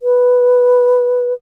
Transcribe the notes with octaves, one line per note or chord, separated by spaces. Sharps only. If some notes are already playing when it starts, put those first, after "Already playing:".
B4